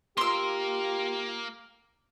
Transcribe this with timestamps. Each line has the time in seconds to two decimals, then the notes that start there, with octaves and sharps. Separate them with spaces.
0.17 A#3 F4 G4 A#4 C6 E6